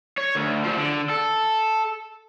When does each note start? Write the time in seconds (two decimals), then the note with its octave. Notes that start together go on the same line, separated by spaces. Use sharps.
0.18 C#5
0.36 D2
0.64 F3 F#3
0.78 D3
1.09 A4